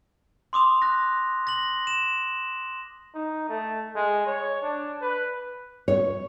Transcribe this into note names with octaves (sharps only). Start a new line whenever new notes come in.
C6 D6 D#6 F7
F#6 A#6
A#6 F#7
E7
D#4
A3
G#3
C#5
D4
B4
C#5